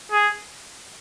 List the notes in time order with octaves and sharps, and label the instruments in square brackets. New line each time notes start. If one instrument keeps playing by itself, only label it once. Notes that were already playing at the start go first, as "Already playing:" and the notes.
[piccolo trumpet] G#4